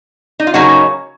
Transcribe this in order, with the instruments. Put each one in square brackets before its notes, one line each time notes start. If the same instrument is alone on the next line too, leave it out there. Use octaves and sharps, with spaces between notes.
[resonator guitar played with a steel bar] D#4
F4
C#3 F#3 A#3 D#4 F#4